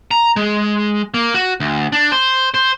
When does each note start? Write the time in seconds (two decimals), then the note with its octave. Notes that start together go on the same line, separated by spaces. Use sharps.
0.11 A#5
0.36 G#3
1.14 A#3
1.34 F#4
1.60 D2
1.92 D4
2.12 C5
2.54 C5